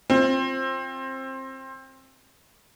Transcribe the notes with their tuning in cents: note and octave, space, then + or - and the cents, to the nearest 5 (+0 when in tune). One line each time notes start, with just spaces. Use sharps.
C4 +20 F4 +0